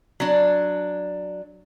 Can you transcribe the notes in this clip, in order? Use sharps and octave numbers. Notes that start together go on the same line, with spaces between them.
F#3 D4